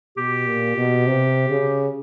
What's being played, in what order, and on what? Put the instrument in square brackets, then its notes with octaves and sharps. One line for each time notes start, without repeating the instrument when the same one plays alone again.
[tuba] B2 [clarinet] G4
[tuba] A#2
B2
C3
C#3